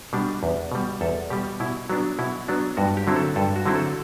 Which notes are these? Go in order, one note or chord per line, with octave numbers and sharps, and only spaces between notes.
B2 G3 D4
E2
B2 G3
E2 A4
B2 G3 G4
B2 E4
F#3 B3 D4
B2 E4
F#3 B3 D4
G2 F#4
G4
D3 F#3 C4 E4
A4
G2 A4
F#4
D3 F#3 C4 E4
A4